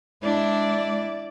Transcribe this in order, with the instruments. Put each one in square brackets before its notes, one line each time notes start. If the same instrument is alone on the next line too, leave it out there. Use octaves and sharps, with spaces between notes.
[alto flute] G#3 [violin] D4 [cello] E4 [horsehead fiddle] D5